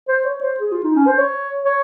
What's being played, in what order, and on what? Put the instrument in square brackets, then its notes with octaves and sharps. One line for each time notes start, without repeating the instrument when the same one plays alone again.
[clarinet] C5
C#5
C5
G#4
F4
D#4
C#4
C5
C#5
C#5